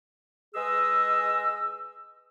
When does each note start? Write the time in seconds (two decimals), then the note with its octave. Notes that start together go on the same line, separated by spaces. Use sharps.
0.55 G#3 G#4 B4 D#5 E6